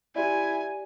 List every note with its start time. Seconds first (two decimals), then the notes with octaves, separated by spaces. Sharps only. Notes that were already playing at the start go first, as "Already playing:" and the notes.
0.16 E4 G4 D5 G#5